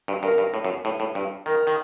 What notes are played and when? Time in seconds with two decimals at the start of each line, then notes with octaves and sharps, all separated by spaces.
0.08 G2
0.23 G2 A#4
0.38 G2
0.54 A2
0.65 F#2
0.85 A2
1.00 A2
1.15 G2
1.46 D#3 A#4
1.67 D#3